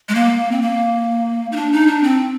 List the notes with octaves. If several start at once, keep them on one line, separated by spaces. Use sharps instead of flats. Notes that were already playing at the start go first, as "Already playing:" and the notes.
G#3
A#3
C4
A#3
D#4
D4
D#4
D4
C4